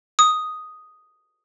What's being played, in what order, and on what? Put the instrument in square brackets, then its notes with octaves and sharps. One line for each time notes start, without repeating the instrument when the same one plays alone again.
[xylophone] D#6